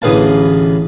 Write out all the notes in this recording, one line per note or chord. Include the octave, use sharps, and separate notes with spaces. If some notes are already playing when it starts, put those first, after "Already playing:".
A1 D3 G#4 B4 F5 A5